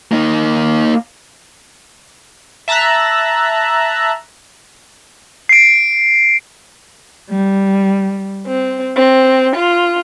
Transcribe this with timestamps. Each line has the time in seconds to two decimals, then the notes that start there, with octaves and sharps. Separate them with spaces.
0.12 A#3 D#4
2.68 E5 A5 A#5 E6 F#6
5.49 C7 D7
7.31 G3
8.46 C4
8.96 C4
9.55 F4